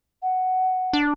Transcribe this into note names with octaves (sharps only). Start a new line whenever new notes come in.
F#5
D4